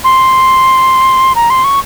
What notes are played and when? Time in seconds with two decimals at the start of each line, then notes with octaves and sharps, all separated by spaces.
0.04 C6
1.35 A#5
1.50 C6
1.64 C#6